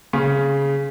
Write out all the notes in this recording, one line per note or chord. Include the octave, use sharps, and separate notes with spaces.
C#3